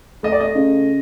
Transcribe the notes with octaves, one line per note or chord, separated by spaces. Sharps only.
A3 D#5
D5
D#5
C#3